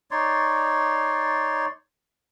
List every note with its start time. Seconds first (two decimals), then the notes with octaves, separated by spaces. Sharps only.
0.11 D#4 C#5 D5 C6